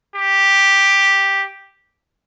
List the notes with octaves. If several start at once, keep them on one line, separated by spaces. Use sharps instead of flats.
G4